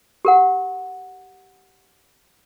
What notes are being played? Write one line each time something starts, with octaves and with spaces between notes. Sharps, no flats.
G4 A#4 F#5